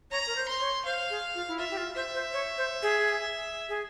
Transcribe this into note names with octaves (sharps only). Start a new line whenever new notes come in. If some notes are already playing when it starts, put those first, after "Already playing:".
C#5 A#5
A#4
C5
C6
C#5
C5 F5
G#4
F4
E4
F4 E5
G4
F4
C5 E5
C5
C#5
C5
G#4
G#4